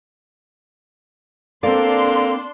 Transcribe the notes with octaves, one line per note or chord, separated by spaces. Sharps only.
A#3 C4 D4 A4 D5 C6